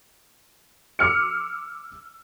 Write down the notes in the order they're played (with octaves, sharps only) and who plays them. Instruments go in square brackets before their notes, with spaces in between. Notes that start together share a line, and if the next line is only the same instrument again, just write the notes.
[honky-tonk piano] D6 E6 F6 C#7